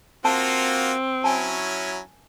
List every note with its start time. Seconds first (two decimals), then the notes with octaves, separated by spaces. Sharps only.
0.25 A#3 C4 F4 F#4 A5
1.24 F#3 C#4 E4 G#5 A5